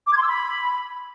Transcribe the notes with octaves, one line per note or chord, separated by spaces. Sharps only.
D6
G#6
C6
E6
B5